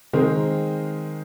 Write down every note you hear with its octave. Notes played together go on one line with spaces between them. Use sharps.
D#3 G#3 C4 A#4